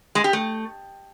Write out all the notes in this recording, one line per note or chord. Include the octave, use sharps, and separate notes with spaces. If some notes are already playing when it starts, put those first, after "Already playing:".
G#3
G4
A3